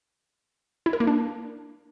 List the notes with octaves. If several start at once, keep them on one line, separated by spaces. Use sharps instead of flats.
E4
A#4
A#3
D4